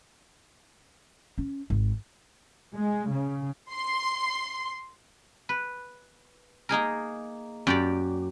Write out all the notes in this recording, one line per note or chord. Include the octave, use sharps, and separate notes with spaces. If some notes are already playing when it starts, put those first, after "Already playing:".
C#4
G#1
G#3
C#3
C6
B4
A#3 D#4 G#4 A#4
F#2 G4 D5